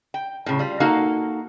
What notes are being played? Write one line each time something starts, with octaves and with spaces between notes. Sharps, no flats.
G5
A2 C#3
G3 F4
A#3 D#4 F#4 A4 F5 A#5